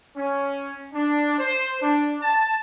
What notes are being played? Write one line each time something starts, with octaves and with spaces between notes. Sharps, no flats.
C#4
D4
C5
D4
A5